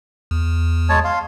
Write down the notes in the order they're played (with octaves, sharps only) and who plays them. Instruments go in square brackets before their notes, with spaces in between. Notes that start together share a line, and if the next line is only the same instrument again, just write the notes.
[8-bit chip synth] E2
[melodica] G#3 C#5 A5
F5 C6